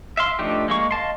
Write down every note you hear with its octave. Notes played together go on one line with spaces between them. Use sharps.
E5 F5 C6
F3 A3 D4 D#4 G4
G#3 A#3 C#6
D#5 F5 A5 C6